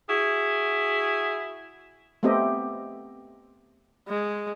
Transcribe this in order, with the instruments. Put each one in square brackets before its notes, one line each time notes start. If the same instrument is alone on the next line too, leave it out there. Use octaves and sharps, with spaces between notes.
[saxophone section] E4 F#4 G#4
[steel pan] A3 B3 C4 G4 D#5 E5
[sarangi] G#3